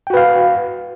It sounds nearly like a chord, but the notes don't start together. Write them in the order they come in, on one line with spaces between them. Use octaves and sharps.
G5 F#4 B4 F5